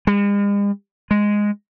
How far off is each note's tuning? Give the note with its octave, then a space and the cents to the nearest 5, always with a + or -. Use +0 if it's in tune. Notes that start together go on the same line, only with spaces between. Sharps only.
G#3 -45
G#3 -5